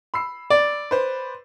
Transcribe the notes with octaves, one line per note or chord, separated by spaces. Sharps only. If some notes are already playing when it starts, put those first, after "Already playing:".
B5 E6 C7
D5
B4 C5